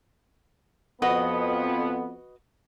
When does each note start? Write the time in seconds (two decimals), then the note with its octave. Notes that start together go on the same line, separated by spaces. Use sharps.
1.02 F2 B3 F#4 B4 D#5